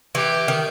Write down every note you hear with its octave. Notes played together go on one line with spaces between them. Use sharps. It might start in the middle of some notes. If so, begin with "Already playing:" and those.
E3 G4
D#3